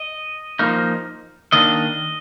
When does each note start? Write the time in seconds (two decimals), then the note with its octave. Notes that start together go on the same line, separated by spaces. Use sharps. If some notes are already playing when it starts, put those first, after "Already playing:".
Already playing: D#5
0.59 F3 A#3 D#4
1.52 D#3 A#3 D4 D#5